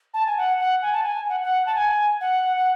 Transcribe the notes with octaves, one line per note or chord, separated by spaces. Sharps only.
A5
G#5
F#5
F#5
G#5
A5
G#5
F#5
F#5
A5
G#5
F#5
F#5